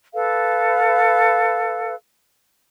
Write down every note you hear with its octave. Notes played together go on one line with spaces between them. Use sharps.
A4 B4 F5